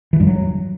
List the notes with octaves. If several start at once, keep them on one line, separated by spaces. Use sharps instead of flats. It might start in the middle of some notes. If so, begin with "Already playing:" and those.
E3
G2
F#3